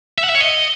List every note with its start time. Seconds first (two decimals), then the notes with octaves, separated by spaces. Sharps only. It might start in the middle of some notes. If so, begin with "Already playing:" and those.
0.18 E5
0.24 F#5
0.29 E5
0.35 C#5
0.40 D#5